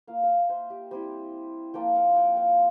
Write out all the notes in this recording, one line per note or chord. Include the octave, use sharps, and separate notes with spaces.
A#3 F4 F5
F5
E5
C5
G4
G3 C4 E4 C5
F3 A#3 D4 F4 G5
F5
G5
F5